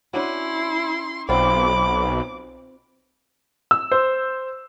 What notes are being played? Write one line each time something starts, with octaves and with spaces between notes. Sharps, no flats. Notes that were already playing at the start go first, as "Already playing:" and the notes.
C#4 D4 E4 F#4 C6
B1 C4 F4 D5 B5 D6
E6
C5